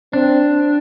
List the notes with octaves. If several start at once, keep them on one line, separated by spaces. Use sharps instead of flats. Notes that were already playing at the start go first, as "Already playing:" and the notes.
C4 D4